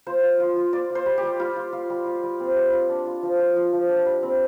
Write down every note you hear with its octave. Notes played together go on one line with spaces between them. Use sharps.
F4 C5
F4
F4
F4
F4 D5
F4
C5
G3
G4
G3
G3 F4
F4
F4
G3
F4
G3
C4
G3
F4
D4
F4
F3
F4
F4
F3
D4
G3
C4